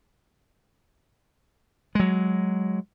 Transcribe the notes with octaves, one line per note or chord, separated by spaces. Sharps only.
F#3 G#3